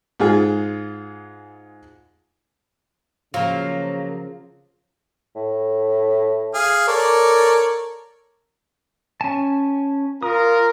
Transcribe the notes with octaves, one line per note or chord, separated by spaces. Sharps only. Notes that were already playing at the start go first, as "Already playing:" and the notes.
G#2 F4 G#4
C#3 F3 F#3 A#3 F4
A2
G#4 F5
A4 A#4 C#5 D5
C#4 G#5 A5
F4 A#4 D#6